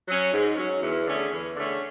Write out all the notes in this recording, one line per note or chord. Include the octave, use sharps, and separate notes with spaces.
F#3 C#4
G#2
F#3 C#4
E2
D3 A3 C#4 G#4
E2
D3 A3 C#4 G#4